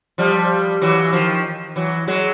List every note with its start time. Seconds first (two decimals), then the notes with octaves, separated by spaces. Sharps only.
0.18 F3 G3
0.82 E3 F#3
1.12 D#3 F3
1.76 E3 F#3
2.08 F#3 G#3